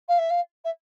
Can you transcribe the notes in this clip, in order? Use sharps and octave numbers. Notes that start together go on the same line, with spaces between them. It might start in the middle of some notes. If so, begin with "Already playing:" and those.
F5
E5
F5
E5